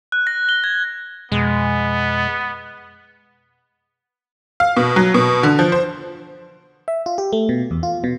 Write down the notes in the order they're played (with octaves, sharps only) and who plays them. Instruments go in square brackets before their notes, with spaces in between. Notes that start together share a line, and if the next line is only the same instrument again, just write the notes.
[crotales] F#6
A#6
G7
G#6
[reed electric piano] F2 B2 [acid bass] G#3 [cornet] B3
[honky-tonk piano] F5
B2
F#3
B2
D3
F3
C5
[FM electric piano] E5
F4
G4
A3
B2
E2
F4
B2